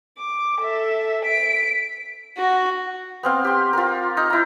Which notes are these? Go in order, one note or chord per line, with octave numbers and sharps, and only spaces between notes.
D6
A4 E5
B6 D7
F#4
B3 C4 F5
G4 C6
F4 A#4
D#4
E4 A#5